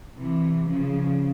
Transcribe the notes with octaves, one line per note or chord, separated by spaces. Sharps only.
C3 E3
C#3 F3